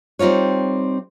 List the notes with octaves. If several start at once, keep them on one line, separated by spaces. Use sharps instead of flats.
G3 C4 D#4 F4 C#5